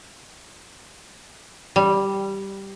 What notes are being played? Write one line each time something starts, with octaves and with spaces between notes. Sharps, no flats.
G3